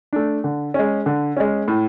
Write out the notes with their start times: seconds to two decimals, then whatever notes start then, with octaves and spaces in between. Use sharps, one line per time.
0.13 A3 D4
0.44 D3
0.74 G#3 C#4
1.06 D3
1.37 G#3 C#4
1.68 A2